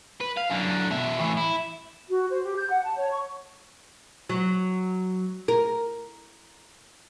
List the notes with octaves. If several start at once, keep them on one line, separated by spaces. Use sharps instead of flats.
B4
F5
F#2 D3
B2 E5
A2 E3
E4
F#4
C5
G4
G6
F#5
A5
C#5
C#6
F#3
A#4